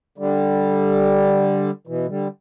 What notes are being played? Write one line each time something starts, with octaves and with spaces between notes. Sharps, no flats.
D3 G3
B2 E3
D3 G3